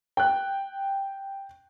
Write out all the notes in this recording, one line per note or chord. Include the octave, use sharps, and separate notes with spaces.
G5 F#6